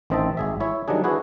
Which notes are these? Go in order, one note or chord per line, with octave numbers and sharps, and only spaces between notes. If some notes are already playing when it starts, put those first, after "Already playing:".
A1 D#3 C4 D#5 E5 A5
G#1 G#4 E5
E4 C#5 E5
D#3 F#3 G3 D4 G#4
D4 E4 F#4 G#4 B4